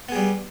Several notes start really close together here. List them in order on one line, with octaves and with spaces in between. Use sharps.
B3 G#4 G3